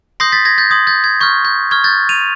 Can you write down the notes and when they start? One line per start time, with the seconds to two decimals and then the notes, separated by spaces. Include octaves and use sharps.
0.20 C6 D#6 G6 A#6 C7
0.32 A6 B6
0.45 G#6 A#6
0.58 G6 A6
0.70 C6 D#6 G6 G#6
0.87 G6 A6
1.04 G#6
1.21 C#6 F6 G6
1.45 G6
1.71 C#6 F6 G#6
1.84 G6 A6
2.09 D#7 F7